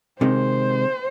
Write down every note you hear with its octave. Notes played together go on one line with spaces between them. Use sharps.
C3 D#3 G#3 C5